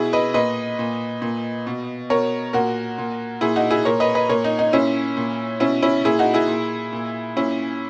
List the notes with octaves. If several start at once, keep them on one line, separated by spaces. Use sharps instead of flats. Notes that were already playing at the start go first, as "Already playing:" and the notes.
Already playing: B2 E4 G#4
B4 D#5
A#2 B4 D#5
A#2
A#2
B2
B2 A#4 C#5
A#2 F#4 A#4
A#2
A#2 E4 G#4
D#4 F#4
E4 G#4
A#2 A#4 C#5
B4 D#5
B4 D#5
A#2 A#4 C#5
D#4
D#4
A#2 C#4 E4
A#2
B2 C#4 E4
C#4 E4
A#2 E4 G#4
D#4 F#4
E4 G#4
A#2
A#2
A#2 C#4 E4